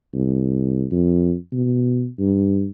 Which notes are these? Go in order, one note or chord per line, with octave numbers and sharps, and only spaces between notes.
C2
F2
B2
G2